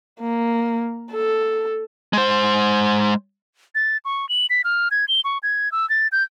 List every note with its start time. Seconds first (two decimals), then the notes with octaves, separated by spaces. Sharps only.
0.20 A#3
1.12 A4
2.13 G#3 C5
3.75 A6
4.05 C#6
4.29 F#7
4.50 B6
4.64 F6
4.91 G#6
5.08 G7
5.24 C#6
5.43 G#6
5.72 E6
5.90 A6
6.12 G6